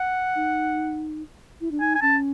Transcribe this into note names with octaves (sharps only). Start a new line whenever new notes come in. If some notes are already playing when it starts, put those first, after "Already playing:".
Already playing: F#5
D#4
E4
D4
D#4 G#5
G#5
C#4 A5